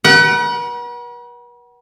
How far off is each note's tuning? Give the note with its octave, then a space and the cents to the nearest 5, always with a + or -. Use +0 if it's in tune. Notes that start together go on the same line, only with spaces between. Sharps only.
B4 -45 F#5 +30